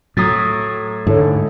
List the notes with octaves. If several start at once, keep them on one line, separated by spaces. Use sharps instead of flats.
A2 F#3 A#5 D#6 G#6 A6
G#2 D3 E4 A4 C#5